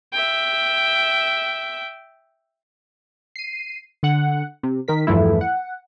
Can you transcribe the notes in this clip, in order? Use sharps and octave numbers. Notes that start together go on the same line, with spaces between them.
E5 G5
C7 D#7
D3 F#5
C3
D#3 A#4 B6
E2 G2 E3 F3 A3 E4
F#5